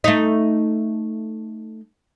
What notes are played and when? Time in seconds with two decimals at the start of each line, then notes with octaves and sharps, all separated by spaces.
0.04 A3 D#4